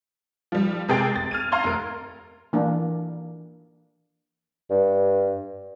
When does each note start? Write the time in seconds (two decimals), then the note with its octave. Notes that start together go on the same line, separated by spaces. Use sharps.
0.52 F3 G3
0.88 C3 G#3 G#4 A#4 G5 A6
1.16 A6
1.31 F6 G#6 D#7
1.52 F5 A#5 C6 G#6
1.64 F1 A#4
2.53 E3 A#3 D4
4.71 G2